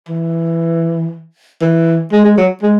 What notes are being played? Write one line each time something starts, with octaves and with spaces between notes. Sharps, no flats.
E3
E3
G#3
G#3
F#3
G#3